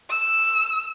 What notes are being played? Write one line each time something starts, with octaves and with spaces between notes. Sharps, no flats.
E6